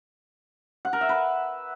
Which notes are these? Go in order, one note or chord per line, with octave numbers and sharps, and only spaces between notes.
F#5
A#4
E5
B4